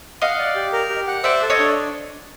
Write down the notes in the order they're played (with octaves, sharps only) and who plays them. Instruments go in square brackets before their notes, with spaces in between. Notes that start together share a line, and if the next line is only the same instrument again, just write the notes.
[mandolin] D#5 F5 [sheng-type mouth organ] F#5
[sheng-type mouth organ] D5
G4
A#4
G4
F#5
[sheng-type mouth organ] C5 [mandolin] D5 E5
[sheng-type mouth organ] A4
[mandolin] C#5 D#5
[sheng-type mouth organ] D4